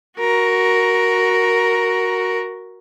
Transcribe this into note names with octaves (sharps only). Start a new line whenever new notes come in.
F#4 A#4